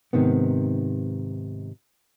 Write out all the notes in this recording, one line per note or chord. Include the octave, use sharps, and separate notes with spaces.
G#2 C3 D#3 B3